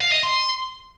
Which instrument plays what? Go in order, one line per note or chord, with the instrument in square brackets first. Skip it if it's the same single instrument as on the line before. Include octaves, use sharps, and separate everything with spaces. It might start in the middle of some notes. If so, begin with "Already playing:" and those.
[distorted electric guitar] F5
D#5
C6